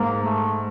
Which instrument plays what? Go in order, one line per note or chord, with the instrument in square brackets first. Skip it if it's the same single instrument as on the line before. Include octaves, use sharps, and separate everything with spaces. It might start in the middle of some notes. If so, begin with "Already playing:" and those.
Already playing: [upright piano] G#2 [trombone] A#3
[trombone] A3